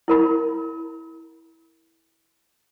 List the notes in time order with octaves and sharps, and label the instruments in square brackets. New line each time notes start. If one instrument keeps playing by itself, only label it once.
[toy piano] E4 A#4 B5